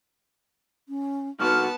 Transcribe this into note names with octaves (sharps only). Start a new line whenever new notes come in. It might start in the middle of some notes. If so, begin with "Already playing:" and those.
C#4
C2 B3 D#4 F#4 A5 F6